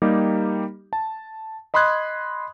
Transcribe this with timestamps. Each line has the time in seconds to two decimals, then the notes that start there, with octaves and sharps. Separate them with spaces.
0.02 G3 A#3 D#4 G4
0.93 A5
1.74 D#5 B5 C6 D#6 F#6 G#6